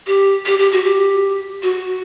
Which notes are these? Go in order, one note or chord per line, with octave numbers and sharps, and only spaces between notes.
G4
G4
G4
F#4
G4
F#4